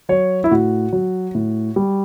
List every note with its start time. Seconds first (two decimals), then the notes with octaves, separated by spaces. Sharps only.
0.09 F#3 C#5
0.44 E4
0.51 A2 F#4
0.93 F#3
1.35 A2
1.76 G3